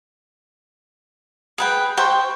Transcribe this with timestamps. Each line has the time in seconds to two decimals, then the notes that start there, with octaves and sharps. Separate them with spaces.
1.58 G#4 B4 G5
1.97 C5 G5 C#6